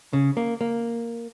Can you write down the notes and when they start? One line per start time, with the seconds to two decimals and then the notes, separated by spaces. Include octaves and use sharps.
0.13 C#3
0.37 A#3
0.61 A#3